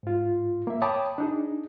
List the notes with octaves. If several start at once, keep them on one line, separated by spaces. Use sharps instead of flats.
G#2 F4
A#3 E5
C#5 G5 A5 B5 D6 D#6
D4 D#4 G#4